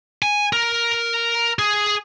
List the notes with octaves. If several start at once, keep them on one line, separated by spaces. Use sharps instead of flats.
G#5
A#4
G#4